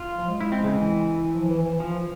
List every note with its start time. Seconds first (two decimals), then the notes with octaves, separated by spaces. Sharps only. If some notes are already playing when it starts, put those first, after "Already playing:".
Already playing: F4
0.17 F3
0.29 G#3
0.40 G#3 E4
0.52 C4
0.64 C#3
0.75 E3
1.34 F3
1.49 E3
1.65 E3
1.80 F3